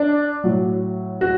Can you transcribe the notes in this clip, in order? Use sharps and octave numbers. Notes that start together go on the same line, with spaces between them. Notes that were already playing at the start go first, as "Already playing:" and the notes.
Already playing: D4
A2 F#3
F#4